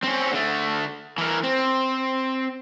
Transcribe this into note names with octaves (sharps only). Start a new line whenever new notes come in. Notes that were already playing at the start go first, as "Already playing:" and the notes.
C4 C#4
D3 A3
E3 A#4
C4